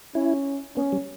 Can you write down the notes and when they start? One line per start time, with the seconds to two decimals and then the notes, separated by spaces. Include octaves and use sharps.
0.15 C#4 E4
0.76 B3 C#4
0.92 G3